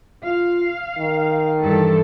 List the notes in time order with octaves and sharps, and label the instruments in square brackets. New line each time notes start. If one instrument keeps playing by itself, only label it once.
[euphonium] F4 [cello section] F5
[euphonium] D#3
[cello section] G2 E3 A4